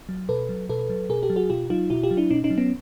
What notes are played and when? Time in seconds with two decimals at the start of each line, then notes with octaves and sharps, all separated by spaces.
0.09 F#3
0.29 B2 A4 B4
0.49 F#3
0.69 B2 A4 B4
0.90 F#3
1.09 B2 G#4 A#4
1.23 G4 A4
1.30 F#3
1.36 F#4 G#4
1.50 B2 F4 G4
1.70 F#3 D#4 F4
1.90 B2 E4 F#4
2.03 F4 G4
2.11 F#3
2.17 D4 E4
2.31 B2 C#4 D#4
2.44 C#4 D#4
2.50 F#3
2.58 B3 C#4